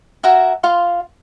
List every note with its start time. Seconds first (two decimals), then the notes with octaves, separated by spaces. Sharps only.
0.23 F#4 A#4 E5 G#5
0.63 F4 F5 C6